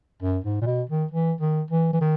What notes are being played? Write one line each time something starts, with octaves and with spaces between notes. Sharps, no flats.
F#2
G#2
A#2
B2
D#3
E3
D#3
E3
E3
D#3